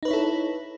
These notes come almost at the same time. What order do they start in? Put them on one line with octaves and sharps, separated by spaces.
D#4 B4 C#5 E4 A4